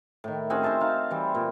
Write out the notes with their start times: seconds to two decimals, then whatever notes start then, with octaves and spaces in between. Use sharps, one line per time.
0.24 A2 D#3
0.50 C4 C#4 F#4 G#4
0.63 C5 E5 A5 C6
0.81 D#4 F5
1.11 E3 G3
1.35 A#2